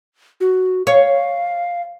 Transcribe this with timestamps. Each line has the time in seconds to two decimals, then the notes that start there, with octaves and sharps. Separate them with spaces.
0.40 F#4
0.87 C#5 F5